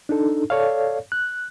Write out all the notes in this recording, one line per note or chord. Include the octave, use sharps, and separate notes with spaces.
D4 D#4 A4
A4 C#5 D5 F5
F#6